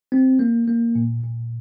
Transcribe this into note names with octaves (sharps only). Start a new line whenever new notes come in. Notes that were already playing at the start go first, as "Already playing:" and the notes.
C4
A#3
A#3
A#2
A#2